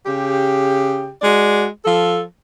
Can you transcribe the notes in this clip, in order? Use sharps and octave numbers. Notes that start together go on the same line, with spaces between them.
C#3 G4
G#3 F#4 D5
F3 A4